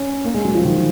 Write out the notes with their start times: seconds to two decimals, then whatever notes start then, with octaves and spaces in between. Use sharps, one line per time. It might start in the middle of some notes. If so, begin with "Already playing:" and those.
Already playing: C#4
0.25 A#3
0.34 G#3
0.44 F#3
0.55 F3
0.65 D#3